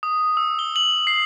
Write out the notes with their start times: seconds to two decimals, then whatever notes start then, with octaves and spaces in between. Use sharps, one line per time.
0.03 D#6
0.37 E6
0.59 G7
0.76 F#7
1.07 C7